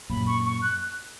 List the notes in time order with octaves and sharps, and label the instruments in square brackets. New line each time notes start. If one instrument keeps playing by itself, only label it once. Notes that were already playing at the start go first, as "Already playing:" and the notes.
[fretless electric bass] F#2 A#2 [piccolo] B5
[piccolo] C#6
C#6
F#6